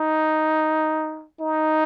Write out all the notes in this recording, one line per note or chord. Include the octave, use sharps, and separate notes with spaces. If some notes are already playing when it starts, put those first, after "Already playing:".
Already playing: D#4
D#4